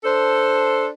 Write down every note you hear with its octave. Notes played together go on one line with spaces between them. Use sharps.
D4 A4 C5